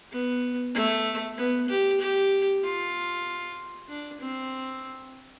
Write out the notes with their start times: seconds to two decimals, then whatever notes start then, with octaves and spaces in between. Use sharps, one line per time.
0.12 B3
0.74 A3
1.37 B3
1.69 G4
2.00 G4
2.64 F4
3.89 D4
4.21 C4